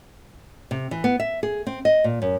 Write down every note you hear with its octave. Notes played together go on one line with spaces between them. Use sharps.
C3
E3
B3
E5
G#4
C4
D#5
A#2
F#2